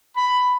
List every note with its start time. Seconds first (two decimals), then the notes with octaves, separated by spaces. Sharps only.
0.17 B5